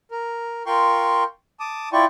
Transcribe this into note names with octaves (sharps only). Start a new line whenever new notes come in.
A#4
F4 A#4 G5 C6 C#6
A5 D6 D#6
E4 F4 D5 G5 C#6